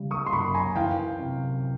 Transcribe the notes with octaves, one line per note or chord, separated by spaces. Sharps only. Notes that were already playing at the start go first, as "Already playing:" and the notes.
Already playing: C#3 G3
C#6 D#6
C6
F#2 B5 C#6
G#5 A#5
E3 F5 G5
C3